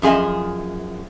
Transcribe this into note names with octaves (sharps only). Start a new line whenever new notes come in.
F#2 F3 G#4 D#5 E5